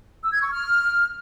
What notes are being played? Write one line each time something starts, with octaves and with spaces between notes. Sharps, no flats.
E6
G#6
C#6
F6